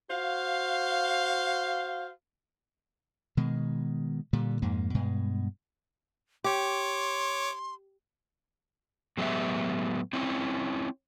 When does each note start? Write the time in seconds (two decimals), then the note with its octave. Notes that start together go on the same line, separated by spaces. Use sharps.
0.10 F#4 C5 F5
3.37 B2 D#3 G#3
4.33 A#2 D3 G3
4.62 F2 G#2 A#3
4.94 G2 B2 G#3
6.44 G4 C#5 C6 D6
9.17 A2 F#3 G#3 B3 G4 E5
10.13 C4 C#4 E4